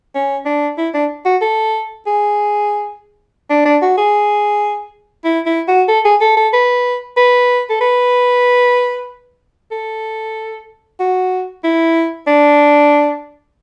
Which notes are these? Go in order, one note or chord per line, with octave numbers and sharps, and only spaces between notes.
C#4
D4
E4
D4
F#4
A4
G#4
D4
D4
F#4
G#4
E4
E4
F#4
A4
G#4
A4
A4
B4
B4
A4
B4
A4
F#4
E4
D4